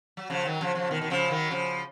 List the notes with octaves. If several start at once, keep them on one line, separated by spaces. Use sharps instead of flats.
F#3
C#3 F3
D#3 F#3
C#3 F3
C#3 F3
B2 D#3
D#3
C#3 F3
D#3 F#3
C#3 F3